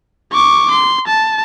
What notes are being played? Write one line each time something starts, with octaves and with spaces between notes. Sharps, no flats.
C#6 D6
C6
A5